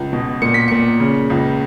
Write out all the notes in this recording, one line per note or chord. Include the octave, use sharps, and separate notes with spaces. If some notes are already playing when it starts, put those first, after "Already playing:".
Already playing: C#2
B2
A#2 C#7
B6
A#2 C#7
C#3
C#2